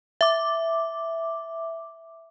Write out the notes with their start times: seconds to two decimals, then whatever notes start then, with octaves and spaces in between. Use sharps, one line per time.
0.21 E5 D6